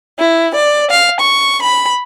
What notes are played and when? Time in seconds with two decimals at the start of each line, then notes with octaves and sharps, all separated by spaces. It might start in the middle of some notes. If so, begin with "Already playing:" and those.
0.18 E4
0.55 D5
0.91 F5
1.20 C#6
1.62 B5